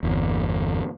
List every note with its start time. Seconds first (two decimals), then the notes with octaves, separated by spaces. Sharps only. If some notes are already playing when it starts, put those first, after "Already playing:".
0.03 G1 E2